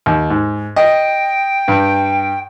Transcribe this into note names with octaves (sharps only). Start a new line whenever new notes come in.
D#2
G#2
D#5 G5
G2